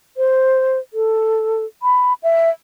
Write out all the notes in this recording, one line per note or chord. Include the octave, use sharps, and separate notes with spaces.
C5
A4
B5
E5